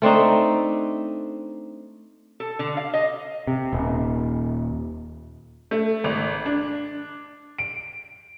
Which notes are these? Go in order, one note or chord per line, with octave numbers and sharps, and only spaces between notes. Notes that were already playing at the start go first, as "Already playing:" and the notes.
A3 C4 D4 D#4
A4
D3
F5
D#5
C3
D#1
A3
G#1
D4
D7